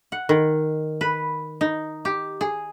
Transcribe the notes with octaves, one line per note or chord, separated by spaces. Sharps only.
F#5
D#3
B4
D#4
G4
G#4